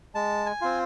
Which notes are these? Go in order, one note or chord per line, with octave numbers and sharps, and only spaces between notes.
G#3 A5
G#5
C4 F4